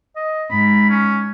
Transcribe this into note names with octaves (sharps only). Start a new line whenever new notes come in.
D#5
G#2 B5
C#4